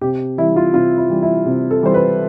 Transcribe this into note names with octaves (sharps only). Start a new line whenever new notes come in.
C3 G4
E3 G3 E4
F4
C3 F4
E4
E3 G3
E4
C3
A4
E3 G3 C5
B4